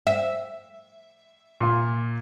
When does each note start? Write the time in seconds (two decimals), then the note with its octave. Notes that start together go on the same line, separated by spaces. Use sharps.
0.07 E5
1.61 A#2 F4